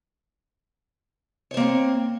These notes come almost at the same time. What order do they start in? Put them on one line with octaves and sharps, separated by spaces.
C#5 C5 A#3 C4